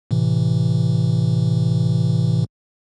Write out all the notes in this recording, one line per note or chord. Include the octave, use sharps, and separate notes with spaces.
A2 C3 E3